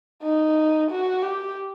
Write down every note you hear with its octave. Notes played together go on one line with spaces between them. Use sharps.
D#4
F#4
G4